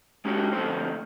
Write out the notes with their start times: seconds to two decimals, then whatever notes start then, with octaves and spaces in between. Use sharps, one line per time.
0.25 G#3 C#4 F#4 G4 C#5
0.53 D2 F3 A3 C4 C5